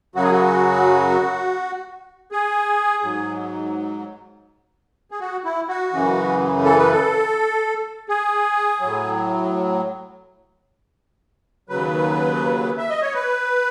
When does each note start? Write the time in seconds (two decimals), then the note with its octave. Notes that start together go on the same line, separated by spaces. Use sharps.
0.15 F#2 C#3 F#3 F#4
0.23 G#4
0.31 F#4
2.32 G#4
3.03 G#2 F#3
5.11 G#4
5.20 F#4
5.44 E4
5.68 F#4
5.92 F#2 C#3 E3
6.64 A4
6.78 B4
6.91 A4
8.09 G#4
8.81 A2 F#3
11.69 D#2 C#3 F#3 B4
12.78 E5
12.89 D#5
13.02 C#5
13.14 B4